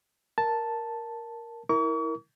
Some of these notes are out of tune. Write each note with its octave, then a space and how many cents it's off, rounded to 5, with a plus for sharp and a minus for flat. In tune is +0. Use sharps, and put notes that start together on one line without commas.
A#4 +0 A5 +0
E4 -20 A#4 +0 C#6 +40